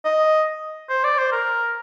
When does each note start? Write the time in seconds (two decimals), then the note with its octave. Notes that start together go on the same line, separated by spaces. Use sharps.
0.05 D#5
0.89 C5
1.04 D5
1.18 C5
1.32 A#4